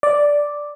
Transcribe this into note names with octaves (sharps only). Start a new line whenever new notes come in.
D5